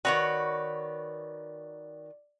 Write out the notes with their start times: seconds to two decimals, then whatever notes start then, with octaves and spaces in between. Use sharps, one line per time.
0.05 D#3 F#4 B4 C#5 D5